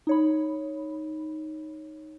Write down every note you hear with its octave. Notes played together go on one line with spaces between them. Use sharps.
D#4 C#5 B5